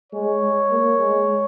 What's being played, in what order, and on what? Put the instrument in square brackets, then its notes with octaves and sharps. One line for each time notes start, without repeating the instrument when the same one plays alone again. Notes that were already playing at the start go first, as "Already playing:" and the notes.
[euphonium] G#3 [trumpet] C#5
[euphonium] G#3
A#3
G#3